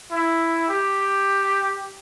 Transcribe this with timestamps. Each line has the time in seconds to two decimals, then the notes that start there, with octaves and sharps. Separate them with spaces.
0.11 E4
0.69 G4